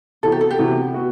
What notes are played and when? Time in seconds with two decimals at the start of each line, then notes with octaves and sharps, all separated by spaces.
0.23 C3 E3 B3 F#4 A4
0.32 G4
0.41 A4
0.51 G4
0.59 C3 E3 B3 F#4
0.94 B3 F#4